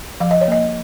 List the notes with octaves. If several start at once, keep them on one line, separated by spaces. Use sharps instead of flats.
F3 F5
D#5
C#5
A#3 D#5